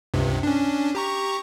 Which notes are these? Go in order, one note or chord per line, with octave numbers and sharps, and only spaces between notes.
C#2 G2 C3
C#4 D4
G4 A#5 C#6